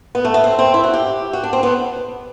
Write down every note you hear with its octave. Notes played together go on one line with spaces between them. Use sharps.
B3
A3
B3
C4
C4
E4
F#4
G4
F#4
D4
C4
B3